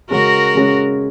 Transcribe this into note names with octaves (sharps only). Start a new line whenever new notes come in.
C#3 G#3 C#4 F#4 A#4
C#3 G#3 C#4